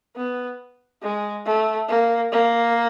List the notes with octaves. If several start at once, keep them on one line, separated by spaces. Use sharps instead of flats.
B3
G#3
A3
A#3
A#3